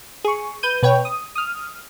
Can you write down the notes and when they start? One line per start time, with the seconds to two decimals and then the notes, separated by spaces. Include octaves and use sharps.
0.24 G#4 C#6
0.63 B4 G6 D#7
0.82 B2 B4 C#5 G5
1.05 D#6
1.35 D#6 F6